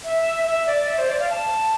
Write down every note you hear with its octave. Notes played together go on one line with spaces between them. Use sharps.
E5
E5
D5
E5
C5
D5
F5
A5